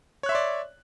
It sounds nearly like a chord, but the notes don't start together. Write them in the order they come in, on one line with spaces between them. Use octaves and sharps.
C#5 F#6 E5 C6 D5